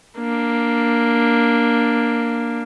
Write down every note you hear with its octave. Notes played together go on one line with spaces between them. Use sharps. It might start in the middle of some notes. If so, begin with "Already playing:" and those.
A#3 D4